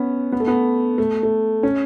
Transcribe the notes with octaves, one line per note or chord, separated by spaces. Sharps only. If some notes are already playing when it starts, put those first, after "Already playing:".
Already playing: B3 C#4
B3
A3
B3
A3
A3
C#4